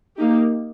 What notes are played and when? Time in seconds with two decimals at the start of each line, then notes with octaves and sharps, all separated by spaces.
0.17 A#3 D#4 G4